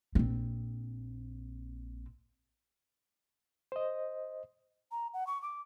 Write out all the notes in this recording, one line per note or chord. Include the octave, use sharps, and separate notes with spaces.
A#1 C4
C5 D#5
A#5
F#5
C#6
D6